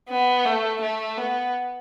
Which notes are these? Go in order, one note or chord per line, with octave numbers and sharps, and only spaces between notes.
B3
A3
A3
B3